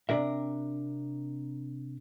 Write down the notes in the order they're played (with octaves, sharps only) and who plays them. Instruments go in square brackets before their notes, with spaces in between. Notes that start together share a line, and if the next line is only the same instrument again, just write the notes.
[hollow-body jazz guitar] C3 D4 A#4 E5